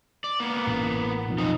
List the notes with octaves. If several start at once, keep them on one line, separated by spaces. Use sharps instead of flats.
D5
A#3 B3
A1
B1 F2
F3 D#4